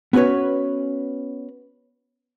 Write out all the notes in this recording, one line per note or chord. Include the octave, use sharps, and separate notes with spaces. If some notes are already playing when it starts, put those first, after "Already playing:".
B3 C#4 F#4 B4 C#5